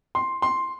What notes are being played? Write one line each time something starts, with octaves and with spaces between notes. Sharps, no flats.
C6
C6